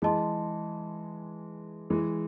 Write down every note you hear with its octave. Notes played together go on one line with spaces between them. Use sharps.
E3 G#3 G#4 D#5 A5 C6
E3 G#3